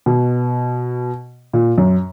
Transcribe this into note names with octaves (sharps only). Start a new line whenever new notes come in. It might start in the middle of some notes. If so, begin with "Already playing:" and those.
B2
A#2
F#2